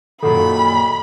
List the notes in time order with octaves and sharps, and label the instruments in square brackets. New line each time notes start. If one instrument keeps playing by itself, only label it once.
[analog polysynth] F#2 A#2 D#3 [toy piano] A4 F#5 C6 [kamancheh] B5